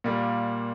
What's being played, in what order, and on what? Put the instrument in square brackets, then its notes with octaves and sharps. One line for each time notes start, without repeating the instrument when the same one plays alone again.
[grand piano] A#2 G3 A#3